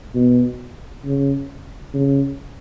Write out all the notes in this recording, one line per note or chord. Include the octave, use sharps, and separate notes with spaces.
B2
C#3
C#3